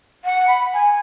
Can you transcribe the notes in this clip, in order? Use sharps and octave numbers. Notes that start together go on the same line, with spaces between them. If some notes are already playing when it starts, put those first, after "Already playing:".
F#5
B5
G#5